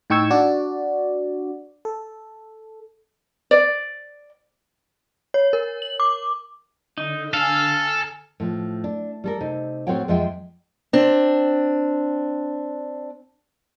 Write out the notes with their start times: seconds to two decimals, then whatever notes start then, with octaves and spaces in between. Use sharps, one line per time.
0.10 A2 D#4 G5 C#6 E6 G#6
0.30 D4 F#4 D5
1.85 A4
3.51 D5
5.34 C#5
5.53 A#4
5.82 F#7
6.00 D6
6.98 D3 D#4
7.33 A4 F5 G#5 F6
8.40 A2 F3
8.84 D4
9.24 G3 A4 A#4
9.41 C3 D#4
9.87 A2 C4 F#4 C#5 F#5 G5
10.08 F2 F3 G#3 C5 E5 G5
10.93 C4 D4